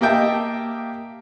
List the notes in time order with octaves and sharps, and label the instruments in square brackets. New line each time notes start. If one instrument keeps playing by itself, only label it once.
[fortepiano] A#3 G4 D#5 E5 G5 A5